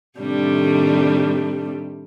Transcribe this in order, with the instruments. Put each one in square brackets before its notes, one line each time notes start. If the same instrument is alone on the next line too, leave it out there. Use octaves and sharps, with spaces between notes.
[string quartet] A2 C3 D#3 G3 A3 D4